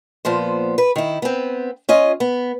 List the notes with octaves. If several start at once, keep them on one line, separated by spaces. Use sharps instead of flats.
A#2 F3 B3 C5
B4
D#3 E4
B3 C4
C#4 F4 D#5
B3